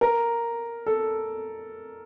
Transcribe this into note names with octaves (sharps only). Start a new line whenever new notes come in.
A#4
A4